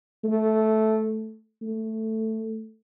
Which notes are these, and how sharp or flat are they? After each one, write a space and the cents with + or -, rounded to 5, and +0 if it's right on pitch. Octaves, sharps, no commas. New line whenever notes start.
A3 -10
A3 +5